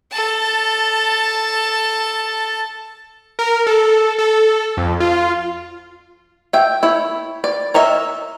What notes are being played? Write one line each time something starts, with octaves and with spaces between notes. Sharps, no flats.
A4 A5
A#4
A4
A4
F2
F4
E5 G5
E4 C#5
D5
A#4 C#5 D#5 E5